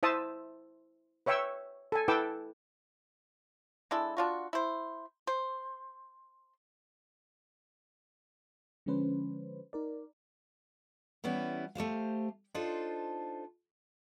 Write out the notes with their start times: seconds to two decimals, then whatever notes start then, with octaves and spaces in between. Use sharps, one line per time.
0.03 E4 C5 E5 A5 D#6
1.26 B4 C#5 E5 G5 C#6 E6
1.92 A4 G#5
2.08 E4 A4 B4 G5 D6 E6
3.91 G#3 D4 E4 A4
4.17 D4 F4 F#4
4.53 E4 C5
5.27 C5
8.86 D3 F3 G#3 C#4 B4 C5
9.73 D#4 A#4 D5
11.24 E3 G3 B3 C#4 E4
11.75 A3 G4 C5 F5
12.54 D4 D#4 F4 A4 C5